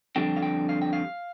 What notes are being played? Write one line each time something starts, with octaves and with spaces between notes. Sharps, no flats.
F2 D3 G3 D4 G5
F5
G5
F5
G5
F5